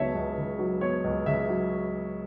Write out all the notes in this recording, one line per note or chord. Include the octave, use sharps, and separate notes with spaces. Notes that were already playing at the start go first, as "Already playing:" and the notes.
Already playing: C#2 C#3 F#3 B3 C#5 E5 A5
C#2
C#3
F#3
B3 C#5
C#2
C#3 E5
F#3